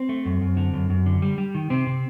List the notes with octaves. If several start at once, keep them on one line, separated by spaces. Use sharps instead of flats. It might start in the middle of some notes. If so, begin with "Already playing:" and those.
Already playing: C4
A3
F#2
F#2
D3
F#2
F#2
D3
G3
G3
D#3
C3 C4
C3